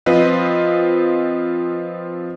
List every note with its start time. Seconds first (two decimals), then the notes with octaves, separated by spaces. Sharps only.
0.06 F3 C4 F4 B4 D#5